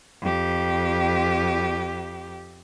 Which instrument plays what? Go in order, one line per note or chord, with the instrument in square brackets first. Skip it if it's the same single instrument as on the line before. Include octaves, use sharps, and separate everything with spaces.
[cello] F2 G4